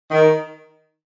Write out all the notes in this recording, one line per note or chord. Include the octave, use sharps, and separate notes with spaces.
D#3